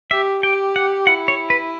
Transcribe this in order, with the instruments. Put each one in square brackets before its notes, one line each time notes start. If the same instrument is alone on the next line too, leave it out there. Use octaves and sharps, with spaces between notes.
[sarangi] G4 [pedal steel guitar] E5
[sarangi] G4 [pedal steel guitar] G5
[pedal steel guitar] F#5
[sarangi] E4 [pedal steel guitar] F#5
[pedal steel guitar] C#5
B4